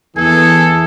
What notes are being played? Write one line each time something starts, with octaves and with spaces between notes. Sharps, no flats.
E2 E3 G#4 A4 G#5